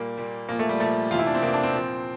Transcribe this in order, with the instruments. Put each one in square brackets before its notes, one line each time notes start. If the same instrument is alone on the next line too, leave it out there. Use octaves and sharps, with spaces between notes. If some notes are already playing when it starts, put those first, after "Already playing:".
Already playing: [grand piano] A#2 G3 A#3
A#2 G3
A#2 F3 A#3
A3
G3
A#2 F3 A3
E2 C3 E3 F4
E4
D4
C4
E2 C3 E3 A#3
D4
C4
A#2 F3